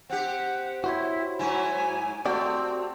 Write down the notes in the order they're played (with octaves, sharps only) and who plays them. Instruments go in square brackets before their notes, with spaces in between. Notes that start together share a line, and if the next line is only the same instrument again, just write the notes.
[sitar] C4 G4 [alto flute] F#5
[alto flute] E4 [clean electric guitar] F#4 C5 C#5
[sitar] G#2 F#3 E4 [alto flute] G#5
[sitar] A3 [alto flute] C4 [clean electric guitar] F#4 G4 D5